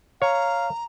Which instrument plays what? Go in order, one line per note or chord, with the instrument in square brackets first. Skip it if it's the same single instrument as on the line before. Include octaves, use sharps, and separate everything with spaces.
[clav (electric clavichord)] C#5 [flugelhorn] F5 [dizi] A#5